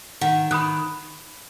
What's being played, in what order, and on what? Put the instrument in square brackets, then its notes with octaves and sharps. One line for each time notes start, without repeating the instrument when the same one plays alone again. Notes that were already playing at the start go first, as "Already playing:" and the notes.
[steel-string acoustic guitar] D#3 [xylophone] F#5
[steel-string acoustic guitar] D#3 [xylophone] B5 D#6 F#6